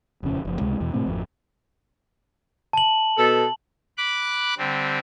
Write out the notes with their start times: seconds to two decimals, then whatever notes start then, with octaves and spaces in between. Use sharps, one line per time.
0.23 D#1 F2 C#3 C#4
0.45 F#1 F3
0.60 C#2 C3 G#3
0.80 E2 B2 E3
0.94 A2 C3 A3 C4
1.06 G#1 F2 F3
2.73 A5 F#7
3.18 B2 A4
3.98 B5 D6 F#6
4.58 D3 G3 C4